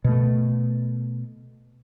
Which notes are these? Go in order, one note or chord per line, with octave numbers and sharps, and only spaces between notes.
B2 A3